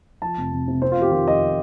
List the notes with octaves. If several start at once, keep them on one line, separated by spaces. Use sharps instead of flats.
F3 A5
F1
F1
C3
C4 C5
F4
F2 G4
D#3 F4
F2 D#5